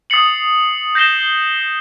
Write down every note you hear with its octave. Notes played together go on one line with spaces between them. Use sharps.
D#6 A6 C7 C#7 F#7
G6 A#6 C7 E7 G7